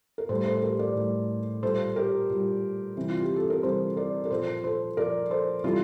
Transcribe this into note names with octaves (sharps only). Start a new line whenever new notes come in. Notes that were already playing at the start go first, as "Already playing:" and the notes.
A#4
A2 G3 A4 C5
A4 C5
G4 A#4
A#4 D5
A2 G3
A#2 G3 A4 C5
G4 A#4
A#2 G3
C3 E3 G3
F4
G4
A4
A#4
C3 E3 G3 A4 C5
A#4 D5
A#4
A#2 F3 A4 C5
A4 C5
A#2 F3 A#4 D5
A4 C5
C3 E3 G3 F4 A4